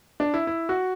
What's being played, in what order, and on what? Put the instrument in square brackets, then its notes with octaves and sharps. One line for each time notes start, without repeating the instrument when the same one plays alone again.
[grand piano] D4
E4
E4
F#4